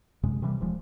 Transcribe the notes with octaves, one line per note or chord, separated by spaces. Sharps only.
F#2 C3 G#3
C3 E3 G3
D#1 F3 G#3